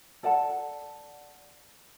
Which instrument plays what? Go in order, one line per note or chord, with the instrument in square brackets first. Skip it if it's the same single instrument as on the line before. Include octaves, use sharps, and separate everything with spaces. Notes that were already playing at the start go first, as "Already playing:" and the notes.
[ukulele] A4 D5 F#5 A5